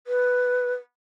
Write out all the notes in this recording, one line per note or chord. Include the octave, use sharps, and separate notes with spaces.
B4